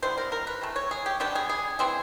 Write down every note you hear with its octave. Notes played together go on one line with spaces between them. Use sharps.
D3 G3 B3 E4 C5
A#4
A#4
B4
C3 E3 A3
C#5
G#4
G4
D3 G3 B3 D4 G4
G#4
G#4
E3 G3 C4 G#4